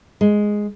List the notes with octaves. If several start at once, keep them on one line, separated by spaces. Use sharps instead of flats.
G#3